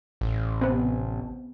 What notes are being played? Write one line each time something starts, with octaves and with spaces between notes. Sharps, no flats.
A1
C3 B3